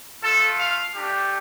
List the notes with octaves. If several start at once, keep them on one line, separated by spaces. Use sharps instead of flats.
A3 F4 A4
F5
A3 D4 G4